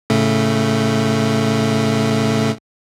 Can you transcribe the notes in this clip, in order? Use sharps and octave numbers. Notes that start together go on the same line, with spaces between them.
A2 C#3 A3